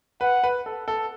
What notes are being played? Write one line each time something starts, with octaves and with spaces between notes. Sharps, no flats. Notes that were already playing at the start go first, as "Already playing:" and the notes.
B4 F#5
B4
A4
A4